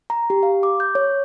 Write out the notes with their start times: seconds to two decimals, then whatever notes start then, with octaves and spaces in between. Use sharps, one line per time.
0.10 A#5
0.30 G4
0.43 F5
0.63 D6
0.80 G6
0.95 C#5